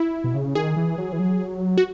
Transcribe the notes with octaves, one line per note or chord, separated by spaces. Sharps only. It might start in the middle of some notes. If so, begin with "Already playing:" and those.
Already playing: E4
B2
C#3
D#3 G#4
E3
F#3
E3
F#3
F#4